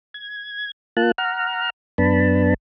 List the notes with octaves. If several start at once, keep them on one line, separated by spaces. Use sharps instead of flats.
G#6
A#3 F4 A5 F#6
F#5 A#5 F6
F#2 B3 D4 A5 B5